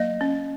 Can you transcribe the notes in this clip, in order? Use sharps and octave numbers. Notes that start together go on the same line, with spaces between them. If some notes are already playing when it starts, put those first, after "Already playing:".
Already playing: F#3 A#3 D#5
C#4